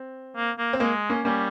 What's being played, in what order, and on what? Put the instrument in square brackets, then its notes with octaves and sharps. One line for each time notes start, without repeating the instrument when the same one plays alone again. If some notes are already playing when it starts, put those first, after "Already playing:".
Already playing: [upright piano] C4
[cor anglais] A#3
A#3
[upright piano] C4
[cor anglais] G#3 [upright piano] A#3
[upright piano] A#3 C#4
[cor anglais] G3 [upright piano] A#3 C#4